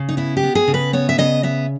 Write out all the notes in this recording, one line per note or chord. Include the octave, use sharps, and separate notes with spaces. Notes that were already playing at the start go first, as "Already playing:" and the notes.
Already playing: C#3
D#4
B3 E4
G4
B3
G#4
C#3
B4
B3 C#5
E5
C#3 D#5
B3 E5